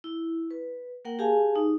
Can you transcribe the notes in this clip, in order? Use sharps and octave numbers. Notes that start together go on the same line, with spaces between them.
E4
B4
A#3 A#4 F#5 G5
G4 G#4 F5 G#5 A5
D#4